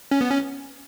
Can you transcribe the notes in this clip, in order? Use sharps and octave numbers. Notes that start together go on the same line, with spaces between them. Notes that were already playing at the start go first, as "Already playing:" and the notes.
C#4
B3
C#4